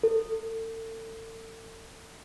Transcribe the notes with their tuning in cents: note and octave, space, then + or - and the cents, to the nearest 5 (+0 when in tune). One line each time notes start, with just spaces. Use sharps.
A4 +35